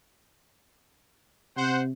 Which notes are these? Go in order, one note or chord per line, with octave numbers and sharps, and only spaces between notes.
C3 C5 F#5